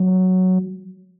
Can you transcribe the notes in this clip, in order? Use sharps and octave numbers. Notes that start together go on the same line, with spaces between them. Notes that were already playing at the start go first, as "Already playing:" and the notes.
Already playing: F#3